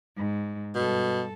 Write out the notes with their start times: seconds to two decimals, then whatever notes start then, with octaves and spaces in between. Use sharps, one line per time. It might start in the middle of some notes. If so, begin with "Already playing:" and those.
0.16 G#2
0.75 G2 B2 A4